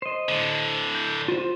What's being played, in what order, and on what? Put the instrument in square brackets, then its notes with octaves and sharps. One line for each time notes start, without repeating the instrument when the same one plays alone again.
[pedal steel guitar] C5 D#5
[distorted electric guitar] A2 D3
[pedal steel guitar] G6
F4 C5